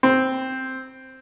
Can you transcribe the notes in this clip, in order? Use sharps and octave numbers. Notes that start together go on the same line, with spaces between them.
C4